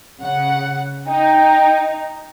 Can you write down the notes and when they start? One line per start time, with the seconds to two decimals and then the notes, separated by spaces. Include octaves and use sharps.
0.20 C#3 F#5
1.08 D#4 G5